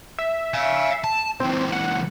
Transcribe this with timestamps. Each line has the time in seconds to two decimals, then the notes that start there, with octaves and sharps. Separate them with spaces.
0.19 E5
0.54 F5 G#5
1.04 A5
1.40 C#2 E3 C4
1.72 F#5